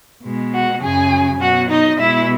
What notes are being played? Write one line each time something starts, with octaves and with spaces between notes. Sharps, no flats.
B2 G#3
F#4 F#5
F#2 C#3 F#3 G#4 G#5
B2 F#3 F#4 F#5
D#4 D#5
B2 G#3 E4 E5